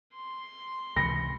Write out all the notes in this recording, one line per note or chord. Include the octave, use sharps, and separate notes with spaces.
C6
C#2 C3 E3 B5 A#6 C#7